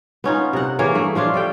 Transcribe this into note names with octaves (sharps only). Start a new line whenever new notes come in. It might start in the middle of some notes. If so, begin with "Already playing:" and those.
B3 C#4 D#4 F4
C3 F#5
E3 A#3 G#4 C#5
G2 A3
F3 D4 F4 C#5
G3 A4 G5